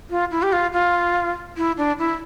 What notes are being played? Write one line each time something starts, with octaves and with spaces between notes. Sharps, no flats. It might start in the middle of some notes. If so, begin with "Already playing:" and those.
F4
E4
G4
F4
F4
E4
D4
E4